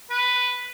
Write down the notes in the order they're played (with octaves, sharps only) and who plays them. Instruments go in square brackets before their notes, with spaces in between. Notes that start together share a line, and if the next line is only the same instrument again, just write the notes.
[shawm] B4